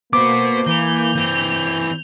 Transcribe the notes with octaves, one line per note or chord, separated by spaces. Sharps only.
A#3 B3 F#4 C5 D6
E3 G6 F7
E3 C4